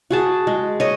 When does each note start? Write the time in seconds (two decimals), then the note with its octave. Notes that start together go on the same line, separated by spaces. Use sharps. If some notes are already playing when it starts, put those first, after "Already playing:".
0.10 F#4 G#4 A5
0.47 G#3
0.80 C#5 D#5